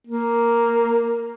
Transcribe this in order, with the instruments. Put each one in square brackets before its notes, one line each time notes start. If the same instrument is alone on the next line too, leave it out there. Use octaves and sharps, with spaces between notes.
[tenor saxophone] A#3